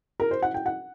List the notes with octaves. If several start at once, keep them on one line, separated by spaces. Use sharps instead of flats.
A#4
C5
F#5
G5
F#5